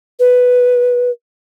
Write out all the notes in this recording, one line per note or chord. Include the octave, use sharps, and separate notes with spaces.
B4